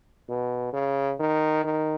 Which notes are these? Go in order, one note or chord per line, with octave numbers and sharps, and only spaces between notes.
B2
C#3
D#3
D#3